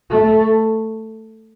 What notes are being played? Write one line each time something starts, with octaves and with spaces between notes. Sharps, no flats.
A3